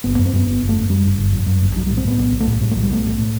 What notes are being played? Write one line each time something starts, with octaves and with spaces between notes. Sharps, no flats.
G1 B3
B3
F#2
C4
F#2 B3
G1 B3
G1
A3
F#2
F#2 G3
G1
G1
F#2
F#2
G1
B1 F#3
G3
A2
C4
A2 B3
B1 B3
B1
A3
A2
A2 G3
A3
B1 F#3
G3
B1 A3
A2
A2